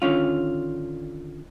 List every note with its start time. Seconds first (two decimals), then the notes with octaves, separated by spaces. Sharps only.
0.02 D3 D#3 C#4 F4